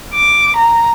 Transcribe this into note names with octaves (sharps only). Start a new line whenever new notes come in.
D6
A#5